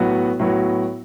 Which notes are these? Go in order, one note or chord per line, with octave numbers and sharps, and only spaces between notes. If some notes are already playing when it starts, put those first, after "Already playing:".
Already playing: A2 F#3 B3 F#4
A2 F#3 B3 F#4